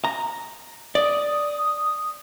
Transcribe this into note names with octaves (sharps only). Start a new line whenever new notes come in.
A#5
D5 D#6